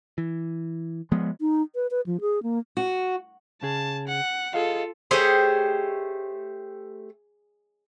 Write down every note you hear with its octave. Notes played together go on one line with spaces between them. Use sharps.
E3
F3 G#3 B3
D#4
B4
B4
F3
G#4
A#3
F#4
C#3 G#4 A5
F#5
F4 G#4 A4 D#5 F5
A3 G4 G#4 C5 C#5 D#5